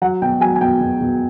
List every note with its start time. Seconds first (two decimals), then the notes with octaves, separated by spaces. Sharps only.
0.02 F#3 F#5
0.22 B2 G5
0.41 F#3 G#5
0.56 G#5
0.61 B2 G5
0.81 B2
1.01 B2